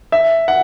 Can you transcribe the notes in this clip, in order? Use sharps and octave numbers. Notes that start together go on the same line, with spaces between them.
E5
F#5